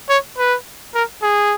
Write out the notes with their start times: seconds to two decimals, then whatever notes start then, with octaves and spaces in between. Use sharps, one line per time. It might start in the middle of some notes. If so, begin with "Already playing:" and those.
0.10 C#5
0.38 B4
0.95 A#4
1.23 G#4